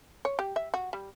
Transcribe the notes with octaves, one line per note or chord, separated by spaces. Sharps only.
C#5
G4
E5
F#4
G3